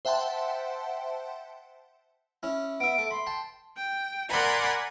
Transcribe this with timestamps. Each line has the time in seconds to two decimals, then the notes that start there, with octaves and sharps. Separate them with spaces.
0.05 C5 E5 F#5 G5 A5 C6
2.43 C#4 E4
2.80 B3 E5 D7
2.98 A3
3.11 B5 C6
3.27 G5 A5
3.77 G5
4.29 A#4 D5 F#5 G#5 B5 C6